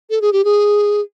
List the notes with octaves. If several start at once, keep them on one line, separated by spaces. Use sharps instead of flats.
A4
G#4
G4
G#4